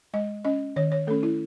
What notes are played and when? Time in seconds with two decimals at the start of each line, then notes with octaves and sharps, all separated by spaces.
0.14 G#3 D#5
0.45 C#4 D#5
0.76 D#3 C#5
0.92 C#5
1.07 A3 C#4 A4
1.23 E4